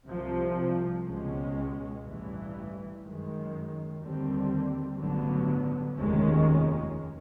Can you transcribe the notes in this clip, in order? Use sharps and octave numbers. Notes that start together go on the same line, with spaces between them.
C2 C3 F3
C#2 B2 G#3 C#4
A1 G2 E3
F#2 D#3 G#3
D#2 D3 G3 C4
A1 G2 D3 F#3 B3
F1 D#2 D#3 G#3 C#4